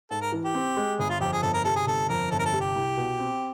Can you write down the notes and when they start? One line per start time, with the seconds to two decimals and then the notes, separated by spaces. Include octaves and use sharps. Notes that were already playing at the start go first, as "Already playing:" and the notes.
0.10 G#2 A4
0.21 A#4
0.32 E3
0.44 G4
0.55 C4
0.77 G#3
0.99 G1 G#4
1.10 F4
1.20 F2 G4
1.32 G#4
1.42 G1 A4
1.53 A#4
1.64 C3 A4
1.76 G#4
1.86 G1 A4
2.09 F2 A#4
2.31 G1 A4
2.39 A#4
2.45 A4
2.53 C3
2.60 G4
2.75 C2
2.97 B2
3.19 C4